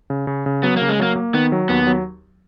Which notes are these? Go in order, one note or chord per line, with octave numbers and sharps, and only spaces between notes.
C#3
C#3
C#3
F#3 B3
A#3
C#3
G#3
F#3 A#3
A#3
D#3 B3
F#3
D#2 B3
F#3